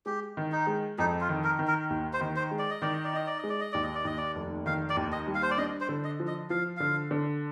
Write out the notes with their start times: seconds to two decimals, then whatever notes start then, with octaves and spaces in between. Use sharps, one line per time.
0.06 G#3 G4
0.37 D#3
0.52 D#4
0.67 G#3
0.98 F2 D#4
1.21 F4
1.29 D#3
1.44 A#4
1.59 D#3
1.67 A#4
1.90 D#2
2.13 C5
2.21 D#3
2.36 C5
2.51 G#3
2.59 D5
2.70 D#5
2.82 D#3 D5
2.93 D#5
3.04 D5
3.13 D#4 D#5
3.27 D5
3.38 D#5
3.44 G#3
3.49 D5
3.61 D#5
3.72 D#2 D5
3.84 D#5
3.95 D5
4.05 D#2 D#5
4.17 D5
4.35 F1
4.66 D#3 F5
4.90 D5
4.97 D#2
5.12 D#5
5.27 G3
5.35 F5
5.43 C5
5.51 D5
5.58 D4 D#5
5.80 C5
5.89 D3
6.04 D#5
6.20 F3
6.27 D#5
6.50 F3 F5
6.77 D3 F5
7.11 D3